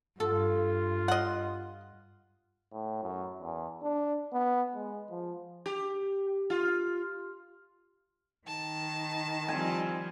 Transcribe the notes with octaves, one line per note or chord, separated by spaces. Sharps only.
G2 F4 A4
D#5 F#5
A2
F#2
E2
D4
B3
G#3
F3
G4
F4
D#3 A5
F3 G3 C4 G#5